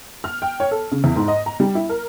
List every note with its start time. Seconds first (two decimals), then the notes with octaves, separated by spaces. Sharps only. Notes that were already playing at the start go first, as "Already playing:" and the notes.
0.24 F6
0.42 G5
0.60 C#5
0.71 A4
0.92 C#3
1.04 E2
1.16 G#2
1.28 D#5
1.46 A#5
1.60 G3
1.75 E4
1.89 A#4